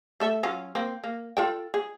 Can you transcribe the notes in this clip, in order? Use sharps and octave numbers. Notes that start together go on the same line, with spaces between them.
A3 A4 E5
F#3 C#4 F4
A#3 C4
A#3
F4 A4 G5
G#4